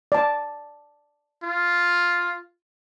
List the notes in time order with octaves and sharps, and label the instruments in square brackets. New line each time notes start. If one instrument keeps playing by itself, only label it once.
[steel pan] D5 A5
[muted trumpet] F4